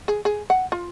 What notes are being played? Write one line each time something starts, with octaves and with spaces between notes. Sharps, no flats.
G#4
G#4
F#5
F4